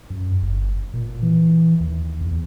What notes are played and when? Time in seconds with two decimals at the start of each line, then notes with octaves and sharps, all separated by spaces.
0.10 F#2
0.42 G1
0.94 A#2
1.22 E3
1.80 D#2
2.21 E2